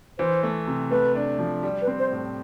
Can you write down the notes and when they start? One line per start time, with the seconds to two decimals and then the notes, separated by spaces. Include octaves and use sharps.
0.18 E3 C5
0.43 A3
0.67 C3
0.90 A3 B4
1.15 D4
1.39 F3
1.63 G3
1.82 B4
1.87 C4
1.99 C5
2.12 A2